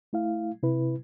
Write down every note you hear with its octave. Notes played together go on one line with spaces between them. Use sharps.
A3 E4 F5
C3 E4 B4